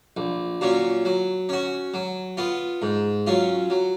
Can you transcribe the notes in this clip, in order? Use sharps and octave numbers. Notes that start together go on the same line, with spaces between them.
A#1
A#2 F#3 C#4
F#3
C#4 F#4
F#3
B3 F4
G#2
F#3 C#4 F4
F#3